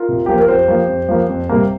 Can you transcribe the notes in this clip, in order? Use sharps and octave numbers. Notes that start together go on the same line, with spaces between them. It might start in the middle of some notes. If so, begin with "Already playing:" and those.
Already playing: F4 A#4
C3
F3 A#3 G4
A#4
F2 G4 C5
F3 A#3
F2
F3 A#3
F2
C3 G3 A#3